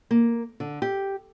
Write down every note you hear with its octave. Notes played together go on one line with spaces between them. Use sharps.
A#3
D3
G4